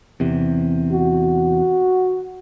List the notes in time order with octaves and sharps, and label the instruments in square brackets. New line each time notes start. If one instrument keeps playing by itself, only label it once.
[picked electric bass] E2 C3
[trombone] F#4